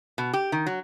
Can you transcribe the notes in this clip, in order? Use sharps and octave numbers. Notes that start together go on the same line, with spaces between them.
B2
G4
D#3
F#3